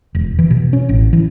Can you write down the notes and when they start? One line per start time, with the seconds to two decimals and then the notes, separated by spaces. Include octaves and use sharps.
0.15 E1
0.39 E3
0.50 B2
0.73 C#4
0.89 A1
1.13 E3